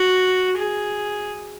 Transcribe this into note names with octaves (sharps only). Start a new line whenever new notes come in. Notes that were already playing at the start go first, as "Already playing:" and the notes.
Already playing: F#4
G#4